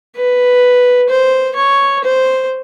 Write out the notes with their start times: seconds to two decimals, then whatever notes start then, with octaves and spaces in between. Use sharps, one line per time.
0.17 B4
1.09 C5
1.56 C#5
2.04 C5